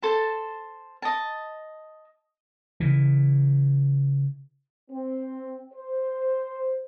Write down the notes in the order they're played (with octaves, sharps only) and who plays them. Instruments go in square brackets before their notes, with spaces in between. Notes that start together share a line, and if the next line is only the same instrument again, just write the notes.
[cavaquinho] A4 C5 A5
D#5 A5
[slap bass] C#3 E3
[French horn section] C4
C5